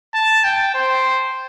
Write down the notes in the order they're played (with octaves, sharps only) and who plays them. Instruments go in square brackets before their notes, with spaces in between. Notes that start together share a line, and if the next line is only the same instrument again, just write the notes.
[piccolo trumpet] A5
G5
C5